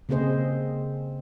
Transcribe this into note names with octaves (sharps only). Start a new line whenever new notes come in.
C#3 A#3 C4 G#4 C5 D#5